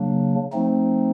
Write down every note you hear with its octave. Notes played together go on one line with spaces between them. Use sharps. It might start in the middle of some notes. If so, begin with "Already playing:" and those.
Already playing: C#3 F#3 A#3 D4
F3 A3 C4 D#4